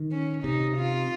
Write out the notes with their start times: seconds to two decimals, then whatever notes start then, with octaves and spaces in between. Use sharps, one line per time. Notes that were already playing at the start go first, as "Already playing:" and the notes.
Already playing: D#3
0.12 C#4
0.44 C3 D#4
0.77 F4